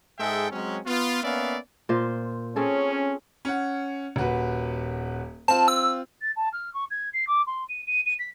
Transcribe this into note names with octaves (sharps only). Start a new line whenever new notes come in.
G#2 G#3 G#4 A4 E5 G5
F#3 G#3 C4 C#4
B3 F4
A#3 B3 C#4 D5 E5 F5
A#2 F4 C5
C4 C#4 G#4 A4
C#4 F#5
D#1 F#4 B4
C4 F4 A5
E6
A6
A5
F6
C#6
G#6
C7
D6
C6
D#7
D#7
D#7
B6